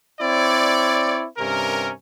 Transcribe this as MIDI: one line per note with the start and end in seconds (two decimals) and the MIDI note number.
0.21 1.24 60
0.21 1.24 64
0.21 1.24 73
0.21 1.24 74
1.37 1.90 43
1.37 1.90 48
1.37 1.90 61
1.37 1.90 70